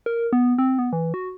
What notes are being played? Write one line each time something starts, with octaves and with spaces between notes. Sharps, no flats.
A#4
B3
C4
B3
E3
F#4